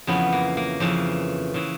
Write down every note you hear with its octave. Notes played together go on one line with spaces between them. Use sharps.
F2 C#3 E3 B3
A#3
A#3
F2 C#3 E3
C#3 E3